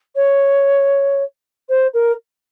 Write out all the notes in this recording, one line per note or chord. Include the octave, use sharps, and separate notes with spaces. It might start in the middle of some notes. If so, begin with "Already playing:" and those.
C#5
C5
A#4